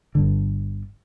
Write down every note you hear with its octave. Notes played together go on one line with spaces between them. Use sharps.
G1 G2 D3